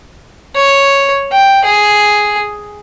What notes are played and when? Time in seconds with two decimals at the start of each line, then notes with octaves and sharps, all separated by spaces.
0.56 C#5
1.32 G5
1.65 G#4